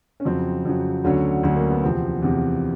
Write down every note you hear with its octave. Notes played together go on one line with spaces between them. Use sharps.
C#4
F2 C#3 F#3 C4
F2 C#3 F#3
D2 D3 F#3 C#4
D2 D3 F#3
A#3
B3
E2 C3 F3 C4
E2 C3 F3